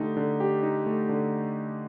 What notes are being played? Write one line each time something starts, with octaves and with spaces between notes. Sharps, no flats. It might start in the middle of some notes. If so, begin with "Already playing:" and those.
Already playing: D3 A3 D#4 G4
D3
G4
D#4
A3
D3